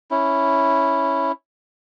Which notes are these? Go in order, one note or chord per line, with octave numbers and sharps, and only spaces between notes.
C#4 E4